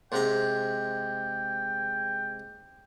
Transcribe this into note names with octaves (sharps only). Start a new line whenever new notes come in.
G#2 C3 G5 A#5